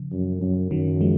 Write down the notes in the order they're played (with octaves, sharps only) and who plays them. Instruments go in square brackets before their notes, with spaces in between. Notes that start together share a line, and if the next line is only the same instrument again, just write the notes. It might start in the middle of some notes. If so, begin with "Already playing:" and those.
Already playing: [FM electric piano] C#3 F3
[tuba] F#2
F#2
[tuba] F#2 [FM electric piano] D#3 F#3
[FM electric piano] F3 G#3